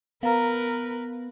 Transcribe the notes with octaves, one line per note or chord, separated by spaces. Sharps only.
B3 A#4 B4 F5 A#5